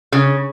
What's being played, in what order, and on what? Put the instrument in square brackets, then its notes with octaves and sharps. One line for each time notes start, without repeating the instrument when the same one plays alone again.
[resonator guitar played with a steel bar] C#3